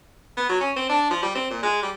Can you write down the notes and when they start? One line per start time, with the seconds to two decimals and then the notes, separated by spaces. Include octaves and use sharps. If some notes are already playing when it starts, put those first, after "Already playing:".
0.37 B3
0.49 F#3
0.61 C#4
0.76 C4
0.89 D4
1.10 F3
1.22 G3
1.35 C4
1.50 A#2
1.63 G#3
1.83 G3